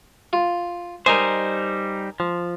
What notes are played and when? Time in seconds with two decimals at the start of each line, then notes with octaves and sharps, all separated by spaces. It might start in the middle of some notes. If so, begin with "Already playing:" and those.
0.33 F4
1.06 G3 D#4 A#4 C5 D#5 G#5
2.20 F3